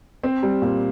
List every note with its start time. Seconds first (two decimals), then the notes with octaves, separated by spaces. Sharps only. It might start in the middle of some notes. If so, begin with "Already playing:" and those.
0.23 C4
0.43 G3
0.62 A#2